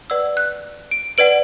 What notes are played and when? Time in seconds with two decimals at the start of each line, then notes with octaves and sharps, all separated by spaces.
0.10 B4 D5 F#5 E6
0.37 F#6
0.91 D7
1.18 B4 D5 F#5 D7